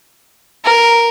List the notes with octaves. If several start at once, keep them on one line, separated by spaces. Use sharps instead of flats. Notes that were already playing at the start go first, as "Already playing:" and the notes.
A#4